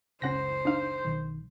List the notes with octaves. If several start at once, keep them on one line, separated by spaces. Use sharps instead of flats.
F#1 C#2 C#3 C#4 C5 F#5 A#6
D4 D#4 F5
B1 D#3